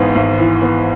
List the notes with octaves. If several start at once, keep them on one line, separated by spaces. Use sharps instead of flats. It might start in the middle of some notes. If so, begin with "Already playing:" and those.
Already playing: G#1 G#2 E3 B3
G#1
E3
B3